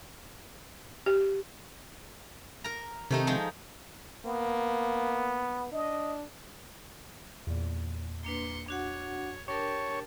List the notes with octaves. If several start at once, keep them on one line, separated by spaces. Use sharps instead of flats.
G4
A#4 A#5
C3 D#3 A3 D#4
F3 G#3 D#4
A#3 B3
D4 D#5
E2 A#2
A#3 D4 B4 C6 C#7
D4 F#4 C#5 F#5
D4 G4 A#4 C#5 A5